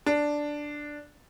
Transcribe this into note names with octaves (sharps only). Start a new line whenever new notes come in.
D4